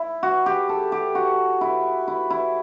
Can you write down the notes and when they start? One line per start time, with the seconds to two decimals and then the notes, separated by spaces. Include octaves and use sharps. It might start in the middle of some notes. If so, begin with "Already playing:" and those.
Already playing: E4
0.23 F#4
0.46 G4
0.69 A4
0.92 G4
1.15 F#4
1.61 E4
2.08 E4
2.30 E4